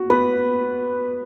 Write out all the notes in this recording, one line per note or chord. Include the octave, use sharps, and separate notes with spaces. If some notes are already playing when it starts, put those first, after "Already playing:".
Already playing: F#4
B3 B4